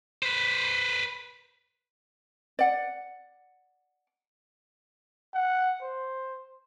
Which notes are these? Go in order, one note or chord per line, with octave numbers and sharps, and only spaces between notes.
B4 C5
D5 F#5
F#5
C5